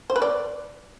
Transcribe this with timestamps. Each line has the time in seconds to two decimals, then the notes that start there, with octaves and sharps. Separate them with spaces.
0.10 C5
0.16 B4
0.22 D5